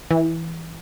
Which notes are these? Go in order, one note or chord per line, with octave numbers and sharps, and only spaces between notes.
E3